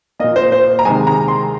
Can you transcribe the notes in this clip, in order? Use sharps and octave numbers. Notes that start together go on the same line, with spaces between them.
A#2 A#3 D#5
C5
C5
A#5
C3 D#3 G#3 G#5
A#5
C6